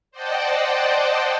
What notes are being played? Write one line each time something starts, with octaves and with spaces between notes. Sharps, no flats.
C5 D5 D#5 F#5 G5 A5